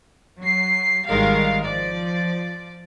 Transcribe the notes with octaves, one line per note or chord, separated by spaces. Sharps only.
F#3 C7
G#1 D#3 G3 G#3 A#4 F5
F3 D5